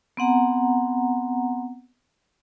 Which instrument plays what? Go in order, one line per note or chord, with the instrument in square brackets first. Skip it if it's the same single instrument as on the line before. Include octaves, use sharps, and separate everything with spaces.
[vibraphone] B3 C4 F#5 A#5